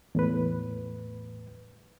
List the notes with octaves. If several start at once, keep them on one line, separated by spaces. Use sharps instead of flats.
E2 A2 B4